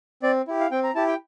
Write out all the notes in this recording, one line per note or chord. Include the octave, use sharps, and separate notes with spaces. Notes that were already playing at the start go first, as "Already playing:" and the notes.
C4 D5
E4 G4
F5
C4 G5
A#5
E4 G4 A5
G5